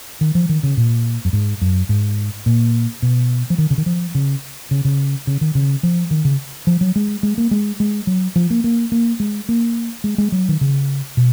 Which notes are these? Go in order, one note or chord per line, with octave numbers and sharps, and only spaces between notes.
D#3
F3
D#3
C#3
A#2
F#2
G#2
F#2
G#2
A#2
B2
F3
D#3
C#3
D#3
F3
C#3
C#3
C#3
C#3
D#3
C#3
F3
D#3
C#3
F3
F#3
G#3
G#3
A#3
G#3
G#3
F#3
F3
A#3
A#3
A#3
G#3
A#3
G#3
G#3
F#3
D#3
C#3
B2